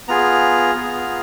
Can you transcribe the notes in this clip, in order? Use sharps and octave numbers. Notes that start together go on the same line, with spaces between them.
B3 F4 G#4 A#5
B3 F4 G#4